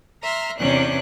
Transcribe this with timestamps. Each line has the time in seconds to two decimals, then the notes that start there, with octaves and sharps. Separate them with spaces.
0.22 E5 A#5 C6 F6
0.59 E2 C3 C#4 D4 C#5 F#6